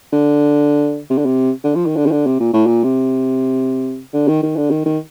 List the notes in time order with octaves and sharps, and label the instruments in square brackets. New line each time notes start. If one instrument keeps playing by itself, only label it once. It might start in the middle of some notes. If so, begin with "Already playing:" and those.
[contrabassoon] D3
C3
D3
C3
D3
F3
D#3
D3
D#3
D3
C3
A#2
A2
A#2
C3
D3
D#3
D#3
D3
D#3
D#3